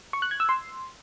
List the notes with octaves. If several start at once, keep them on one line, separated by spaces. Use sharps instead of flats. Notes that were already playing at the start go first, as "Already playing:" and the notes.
C#6
F#6
G#6
E6
C6